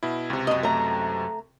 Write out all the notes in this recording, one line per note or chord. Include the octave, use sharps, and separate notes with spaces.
B2 E4
C#2 C3
F#2 D#5
A3 A#5